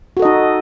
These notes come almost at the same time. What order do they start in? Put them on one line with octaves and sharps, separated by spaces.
F#4 A4 D#5 D#4